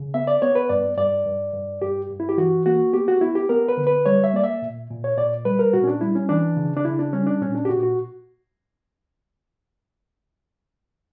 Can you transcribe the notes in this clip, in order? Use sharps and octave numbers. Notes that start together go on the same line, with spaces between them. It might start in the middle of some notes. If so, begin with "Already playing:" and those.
Already playing: C#3
B3 E5
D5
B3 C#5
B4
G2 D5
G2 D5
G2
G2
G2 G4
G2
E4
G4
E3 F#4
A#3 F#4
B3 G4
F#4
B3 E4
G4
B3 A#4
B4
D3
B4
G3 C#5
E5
A#3 D5
E5
A#2
A#2
C#5
A#2 D5
G3 B4
A#4
A#2 F#4
C#4
D4
G3 E4
C#4
E3 D4
C#3
D4
C#3 E4
D4
G3 C#4
D4
A#2 C#4
D4
G4
A#2 F#4
F#4